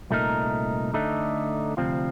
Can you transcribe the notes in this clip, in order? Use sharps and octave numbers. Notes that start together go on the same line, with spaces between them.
C2 A#2 A3 D#4 A#4
D3 A3 D#4
D2 C3 F3 C4 F4